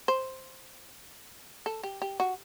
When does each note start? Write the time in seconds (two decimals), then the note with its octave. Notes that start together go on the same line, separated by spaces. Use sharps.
0.08 C5
1.66 A4
1.83 G4
2.02 G4
2.20 F#4